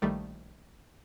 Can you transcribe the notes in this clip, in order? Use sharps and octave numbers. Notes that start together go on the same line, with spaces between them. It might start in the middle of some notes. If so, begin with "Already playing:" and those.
A#1 D#3 G3 A3